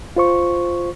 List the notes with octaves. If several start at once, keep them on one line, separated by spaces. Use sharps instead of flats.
F4 C5 C#6